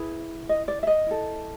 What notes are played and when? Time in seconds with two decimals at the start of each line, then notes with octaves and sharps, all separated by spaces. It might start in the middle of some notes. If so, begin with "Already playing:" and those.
Already playing: E4 G#4 B4
0.49 D#5
0.68 D5
0.83 E5
0.87 D#5
1.07 E4 A4